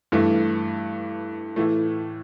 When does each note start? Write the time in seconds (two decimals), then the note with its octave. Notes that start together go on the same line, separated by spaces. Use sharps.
0.12 G2 E3 A3
1.56 A2 E3 A3